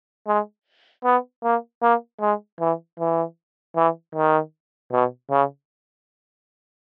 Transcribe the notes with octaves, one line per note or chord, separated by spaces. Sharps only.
G#3
B3
A#3
A#3
G#3
E3
E3
E3
D#3
B2
C#3